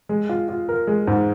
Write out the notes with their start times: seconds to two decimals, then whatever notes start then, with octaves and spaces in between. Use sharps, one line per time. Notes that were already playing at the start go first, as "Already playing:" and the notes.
0.09 G#3
0.29 F4
0.49 F4
0.69 A#4
0.87 G#3
1.07 G#2